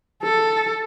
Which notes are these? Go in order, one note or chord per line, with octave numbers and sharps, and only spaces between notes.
A4